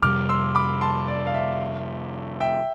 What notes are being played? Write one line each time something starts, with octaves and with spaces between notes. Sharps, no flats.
F2 C3 G3 D6 F6
C6 E6
B5 D6
A5 C6
D5
F5
E5
E5 G5